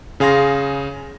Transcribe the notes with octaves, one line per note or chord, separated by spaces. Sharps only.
C#3 G#4 F5 C6 A#6